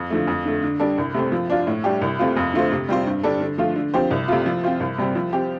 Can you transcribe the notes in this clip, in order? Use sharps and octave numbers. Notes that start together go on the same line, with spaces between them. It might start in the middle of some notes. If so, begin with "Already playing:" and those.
Already playing: F2
D3 F3 A3
F2
D3 A3
D3
G3 D4 A4
C2
C3 A3 C4
F3
D4 F4
A2
G3 D4 G4
C2
C3 A3 C4 F4
F2
D3 A3 F4 C5
C3
G3 C4 F4 C5
G2
D3 G3 D4 A4
D3
F3 A3 F4
D3
F3 C4 G4 C5
C2
C3 A3 F4
F3
C4 F4 C5
C2
C3 G3 C4
F3
C4 G4